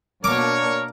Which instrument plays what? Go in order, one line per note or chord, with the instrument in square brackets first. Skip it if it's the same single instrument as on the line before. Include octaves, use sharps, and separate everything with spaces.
[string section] B2 A#3 D4 [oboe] A#4 [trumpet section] C#5 [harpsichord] D6